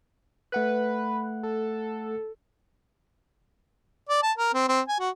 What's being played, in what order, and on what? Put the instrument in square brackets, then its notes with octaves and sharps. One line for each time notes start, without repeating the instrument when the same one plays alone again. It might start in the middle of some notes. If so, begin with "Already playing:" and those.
[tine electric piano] A3 F#5 F#6 [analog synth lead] B4
[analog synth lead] A4
[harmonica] D5
A5
A#4
C4
C4
G#5
F#4